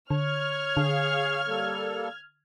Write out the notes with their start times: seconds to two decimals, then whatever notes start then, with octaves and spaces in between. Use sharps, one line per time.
0.11 D3 C#5 F6 G#6
0.77 D3 G#4 F5
1.47 G3 A#3 A4